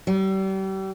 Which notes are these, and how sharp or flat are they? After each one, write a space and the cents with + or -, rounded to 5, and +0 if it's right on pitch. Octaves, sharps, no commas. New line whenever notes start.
G3 -35